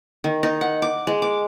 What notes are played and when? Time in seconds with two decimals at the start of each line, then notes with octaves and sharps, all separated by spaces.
0.24 D#3
0.43 D#4
0.61 F#5
0.82 D6
1.07 G#3
1.22 D6